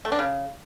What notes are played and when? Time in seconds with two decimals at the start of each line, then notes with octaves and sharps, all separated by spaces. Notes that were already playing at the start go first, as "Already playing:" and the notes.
0.05 A3
0.12 D4
0.19 C#3